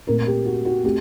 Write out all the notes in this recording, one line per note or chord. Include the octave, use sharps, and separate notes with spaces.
A#2 A3 C4 A#4
G4
F#4
F#4
A3 C4 G4